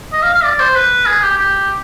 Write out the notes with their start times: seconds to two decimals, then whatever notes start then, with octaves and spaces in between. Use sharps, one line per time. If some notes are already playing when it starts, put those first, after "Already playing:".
0.13 D#5
0.23 F5
0.34 F5
0.44 D5
0.60 C5
0.75 B4
1.06 G#4
1.23 G4
1.38 G4